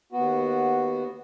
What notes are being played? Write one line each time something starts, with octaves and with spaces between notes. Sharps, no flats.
D#2 B3 F#4